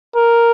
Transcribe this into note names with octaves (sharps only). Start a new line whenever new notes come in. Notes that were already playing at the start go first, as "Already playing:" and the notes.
A#4